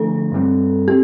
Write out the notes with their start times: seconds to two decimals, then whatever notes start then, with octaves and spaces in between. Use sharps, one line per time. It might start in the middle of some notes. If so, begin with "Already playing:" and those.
Already playing: D3 F3 A3 D4 A4
0.32 G2 G3 C4
0.88 C4 G4